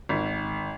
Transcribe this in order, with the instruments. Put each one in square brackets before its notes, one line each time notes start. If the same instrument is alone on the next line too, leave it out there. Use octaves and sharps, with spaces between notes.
[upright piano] G#1